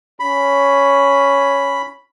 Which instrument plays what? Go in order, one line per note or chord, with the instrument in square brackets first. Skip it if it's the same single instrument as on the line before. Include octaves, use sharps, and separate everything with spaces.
[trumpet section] C#4 C#5 [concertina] B5